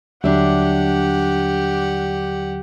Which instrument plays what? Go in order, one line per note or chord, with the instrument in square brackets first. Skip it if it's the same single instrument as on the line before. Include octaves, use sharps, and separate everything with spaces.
[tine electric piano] D#2 D3 F#3 [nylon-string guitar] G3 D4 E5 [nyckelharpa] G4 F#5